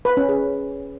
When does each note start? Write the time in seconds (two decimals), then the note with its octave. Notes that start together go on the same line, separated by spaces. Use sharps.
0.05 B4
0.17 C#4
0.29 G#4